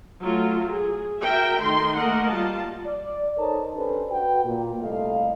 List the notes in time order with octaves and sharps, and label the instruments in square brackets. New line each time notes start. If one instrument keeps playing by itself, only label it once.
[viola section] F#3 A3 F4
G#4
F#4 A#4 E5 G5
D#3 A3 D#4 C6
A3 A#3 A#4 D#5 F#5
G3 F4 A5
[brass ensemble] D5
D#4 A4 A#4 C5 C#5 A5
C#4 D4 G4 A4 B4 C5
F#4 B4 G5
A#2
C2 A3 A4 D#5 F5